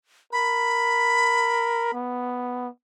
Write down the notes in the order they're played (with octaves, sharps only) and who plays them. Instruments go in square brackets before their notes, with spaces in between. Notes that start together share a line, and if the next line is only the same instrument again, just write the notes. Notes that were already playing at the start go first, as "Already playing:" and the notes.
[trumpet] A#4 [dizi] B5
[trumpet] B3